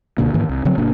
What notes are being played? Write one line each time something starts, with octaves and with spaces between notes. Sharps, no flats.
C#2 B2 D3 A#3
G#2 D#3 E3 A#3
C2
C#3 F3 F#3 C4
G1 B2 A#3 D4